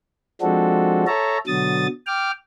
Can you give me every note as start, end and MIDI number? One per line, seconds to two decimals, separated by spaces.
0.41 1.05 53
0.41 1.05 56
0.41 1.05 60
0.41 1.05 62
0.41 1.05 66
0.41 1.05 69
1.07 1.38 69
1.07 1.38 73
1.07 1.38 76
1.07 1.38 81
1.07 1.38 82
1.47 1.87 47
1.47 1.87 50
1.47 1.87 54
1.47 1.87 87
1.47 1.87 93
2.07 2.31 79
2.07 2.31 86
2.07 2.31 89